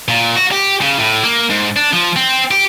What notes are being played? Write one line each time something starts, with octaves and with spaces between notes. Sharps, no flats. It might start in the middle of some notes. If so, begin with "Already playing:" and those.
A#2
F#4
G4
C#3
A2
A#3
G#2
D4
F3
C4
G4